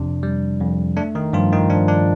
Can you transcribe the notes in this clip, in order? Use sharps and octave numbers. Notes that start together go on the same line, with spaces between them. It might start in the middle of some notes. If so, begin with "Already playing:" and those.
Already playing: F2 C3 D4
G3
F2
A3 D4
D#3 D#4
G2 F3 F4
D#3 D#4
F3 D4
D4